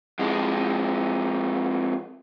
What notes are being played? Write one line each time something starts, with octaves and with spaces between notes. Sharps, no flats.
F2 G#3